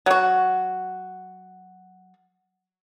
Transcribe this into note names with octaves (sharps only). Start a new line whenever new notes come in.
F#3 F#4